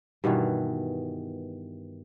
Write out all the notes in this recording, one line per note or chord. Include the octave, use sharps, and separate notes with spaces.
G2 B2 D#3 E3